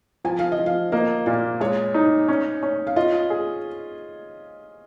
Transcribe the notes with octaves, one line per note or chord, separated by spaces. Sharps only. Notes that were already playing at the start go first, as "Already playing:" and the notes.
F3 G#5
F5
D#5
F3
F5
A#3 D#5
A#2 F5
G#3 C#5
D#4
C#4
C#4
F5
F4 D#5
G#4